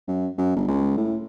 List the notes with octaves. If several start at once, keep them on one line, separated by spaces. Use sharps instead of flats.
F#2
F#2
G1
C#2
A2